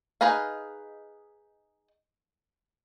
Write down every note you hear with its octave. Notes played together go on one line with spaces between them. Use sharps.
D#4 G#4 B4 D#5 F5